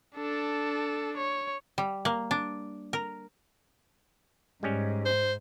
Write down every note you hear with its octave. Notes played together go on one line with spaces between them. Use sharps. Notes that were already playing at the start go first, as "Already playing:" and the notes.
D4 A4
C#5
G3
A#3
D4
A#4
G#2 G3 G#3 C#4
C5